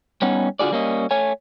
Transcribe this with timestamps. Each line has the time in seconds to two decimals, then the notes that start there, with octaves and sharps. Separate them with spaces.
0.22 G3 B3 C#4 D#4 F#5
0.59 D3 F4 F#4 G#4 D5
0.72 G3 A#3 C#4 D#5
1.11 A3 C#5 G#5